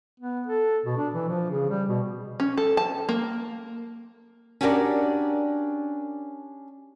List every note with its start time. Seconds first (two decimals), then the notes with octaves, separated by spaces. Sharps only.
0.20 B3
0.47 A4
0.85 B2
0.97 D4
1.14 E3
1.28 F3
1.50 C#3
1.70 G3
1.88 B2
2.40 C#4
2.58 A4
2.77 A5
3.09 A#3
4.61 C#4 D4 F#4 G4 A#4 D5